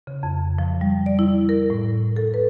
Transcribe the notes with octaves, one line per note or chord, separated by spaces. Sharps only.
C#3
F2
F3
G3
D5
E4
A#4
A2
A4
B4